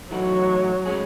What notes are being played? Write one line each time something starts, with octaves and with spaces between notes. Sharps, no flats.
A2 E3 F#3 A3 D#4 F#4
A2 G#3 C#4 G#4